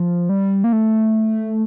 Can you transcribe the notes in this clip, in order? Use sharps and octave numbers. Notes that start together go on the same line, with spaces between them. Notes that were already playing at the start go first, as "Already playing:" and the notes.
Already playing: F3
G3
A#3
A3